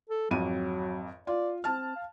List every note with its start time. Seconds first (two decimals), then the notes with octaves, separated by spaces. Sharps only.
0.09 A4
0.31 G#1 F2 F#3 D#7
1.27 F4 D5
1.64 C4 A5 F6
1.96 F5